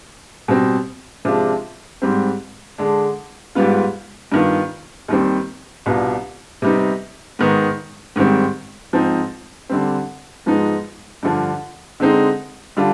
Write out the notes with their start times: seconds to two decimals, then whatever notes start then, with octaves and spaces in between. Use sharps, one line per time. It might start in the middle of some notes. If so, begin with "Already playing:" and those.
0.48 B2 G3 C4
1.25 C3 F3 G#3 D4 F4
2.02 G#2 G3 C4
2.78 D3 G#3 D4
3.55 G#2 G3 B3 F4
4.32 G2 D#3 B3 F4
5.08 D#2 D#3 G3 C4
5.86 C2 B2 B3 D4 F4
6.62 C3 G3 B3 D#4
7.39 G#2 D#3 B3 D#4
8.16 G#2 D#3 G3 C4
8.93 G#2 F3 C4 D#4
9.70 D3 G3 C4
10.46 G#2 F3 G#3 B3 D#4
11.23 G2 D3 F3
12.00 D3 G#3 C4 D#4
12.77 D3 G3 D4 F4